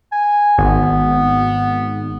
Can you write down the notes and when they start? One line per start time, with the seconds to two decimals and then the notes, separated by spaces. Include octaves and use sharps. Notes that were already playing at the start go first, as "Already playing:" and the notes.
0.12 G#5
0.58 G#1 B3